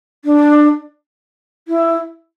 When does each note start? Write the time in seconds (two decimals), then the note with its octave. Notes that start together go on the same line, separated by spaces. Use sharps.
0.25 D4
1.68 E4